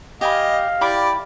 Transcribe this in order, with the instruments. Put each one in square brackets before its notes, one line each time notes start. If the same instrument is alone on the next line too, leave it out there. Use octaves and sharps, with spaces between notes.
[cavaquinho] G4 G#5 B5 [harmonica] D#5 [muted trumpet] F5
[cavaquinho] E4 B5 D6 [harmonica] G4 D5